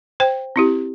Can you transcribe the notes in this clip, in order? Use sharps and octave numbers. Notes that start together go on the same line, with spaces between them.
C5 G5
C4 E4 G4